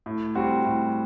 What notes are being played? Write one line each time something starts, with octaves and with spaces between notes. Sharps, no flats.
A2
G3 C4 F#4
A2